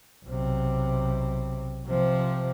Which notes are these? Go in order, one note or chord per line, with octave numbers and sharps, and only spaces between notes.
B1 C3
C3 F3